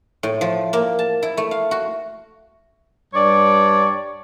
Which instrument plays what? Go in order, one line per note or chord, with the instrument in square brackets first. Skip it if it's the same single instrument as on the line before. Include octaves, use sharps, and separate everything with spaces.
[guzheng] A2
F3
A#3
A5
E4
A3
F5
F#4
[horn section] G2 C#5 D5